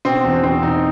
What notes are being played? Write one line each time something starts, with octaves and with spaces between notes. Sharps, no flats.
B2 C4
E2
B2 C4
B2 D#4